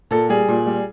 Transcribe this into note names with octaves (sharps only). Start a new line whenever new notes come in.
A#2 A4
G3 G#4
A#2
G3